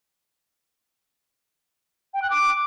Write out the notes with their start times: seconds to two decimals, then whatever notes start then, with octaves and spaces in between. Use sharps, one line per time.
2.14 G5
2.22 F#6
2.30 D6